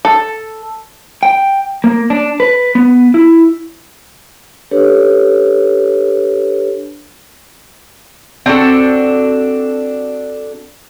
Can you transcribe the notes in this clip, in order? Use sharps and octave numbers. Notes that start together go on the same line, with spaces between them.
A4
G5
A#3
D4
B4
B3
E4
D4 G4 A4 B4 C#5
C4 D4 F#4 A4